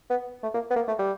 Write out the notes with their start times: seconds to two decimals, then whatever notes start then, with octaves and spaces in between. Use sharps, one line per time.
0.10 B3
0.43 A3
0.54 A#3
0.71 B3
0.76 A#3
0.88 A3
0.99 G3